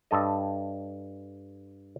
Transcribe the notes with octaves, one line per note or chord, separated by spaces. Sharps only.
G2 A4 D#5